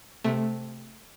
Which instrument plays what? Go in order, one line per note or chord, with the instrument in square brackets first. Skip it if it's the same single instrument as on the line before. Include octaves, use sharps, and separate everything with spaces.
[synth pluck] C3 A3